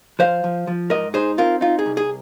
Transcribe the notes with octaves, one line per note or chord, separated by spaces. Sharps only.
F3 C5 F5
F3
F3
G#2 A#4 D#5
D#4 G#4 C5
C4 F4 A#4
D#4 F4
G#4
C2
G#4